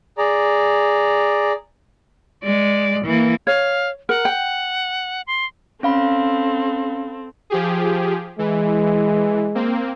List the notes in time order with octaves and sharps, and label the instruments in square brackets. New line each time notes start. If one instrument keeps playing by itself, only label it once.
[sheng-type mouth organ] G#4 D5 A#5
[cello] G#3 D5
E3 A#3
[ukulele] C#5 [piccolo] F5
[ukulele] A#4 [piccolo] F#5
[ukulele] G5
[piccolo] C6
[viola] C4 A4 [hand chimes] C#4 F5 B5
[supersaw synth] F3 G4 G#4
[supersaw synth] E3 [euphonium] G#3
[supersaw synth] A#3 C4